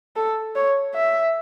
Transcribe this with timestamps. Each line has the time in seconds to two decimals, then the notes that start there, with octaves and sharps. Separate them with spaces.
0.16 A4
0.55 C#5
0.95 E5